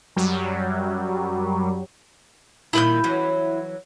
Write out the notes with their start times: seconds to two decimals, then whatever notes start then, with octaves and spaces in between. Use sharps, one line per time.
0.16 F#2 F#3 G3
2.73 A#2 D#3 G3 E4 B5 G6
3.04 E3 F#3 C#4